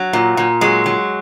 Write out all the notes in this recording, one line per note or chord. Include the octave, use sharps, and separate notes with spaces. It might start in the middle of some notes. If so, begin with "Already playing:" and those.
Already playing: F#3
A#2
A#2
F#3 G#3
F#3